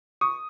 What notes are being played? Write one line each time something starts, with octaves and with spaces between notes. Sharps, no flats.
C#6 D#6